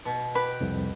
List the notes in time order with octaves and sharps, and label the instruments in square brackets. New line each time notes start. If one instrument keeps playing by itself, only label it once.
[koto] B2
[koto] G4 [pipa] B4
[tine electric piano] C2 F2